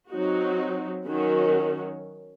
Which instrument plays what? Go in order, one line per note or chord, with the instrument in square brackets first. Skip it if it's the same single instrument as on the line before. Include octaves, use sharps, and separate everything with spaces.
[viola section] F#3 C4 D#4 F#4
D#3 F#3 C#4 F#4